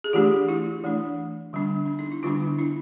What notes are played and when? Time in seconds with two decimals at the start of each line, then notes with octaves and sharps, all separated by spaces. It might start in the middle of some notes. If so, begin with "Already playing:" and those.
0.04 G#4
0.13 E3 A3 D4 F4 G4
0.48 E4 F#4
0.84 E3 A3 D4
1.53 D3 G3 B3 D4
1.86 D4
1.99 D#4
2.11 E4
2.23 D3 G3 B3 D4 D#4 F4
2.58 D4 E4